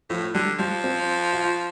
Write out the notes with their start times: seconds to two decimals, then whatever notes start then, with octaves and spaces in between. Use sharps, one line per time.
0.10 A2 F3
0.34 D3 G3
0.59 F3 G3
0.84 C4
1.33 F4